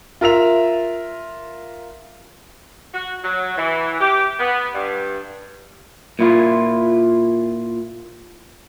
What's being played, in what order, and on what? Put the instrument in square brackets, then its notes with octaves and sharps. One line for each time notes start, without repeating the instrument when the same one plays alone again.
[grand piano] F4 A#4 E5 F7
[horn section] F#4
F#3
E3
G4
B3
G2
[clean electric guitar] A#2 E4 F4